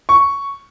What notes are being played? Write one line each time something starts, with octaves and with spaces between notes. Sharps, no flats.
C#6